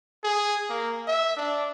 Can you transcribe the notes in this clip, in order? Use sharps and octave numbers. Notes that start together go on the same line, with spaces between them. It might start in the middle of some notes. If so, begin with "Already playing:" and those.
G#4
A#3
E5
D4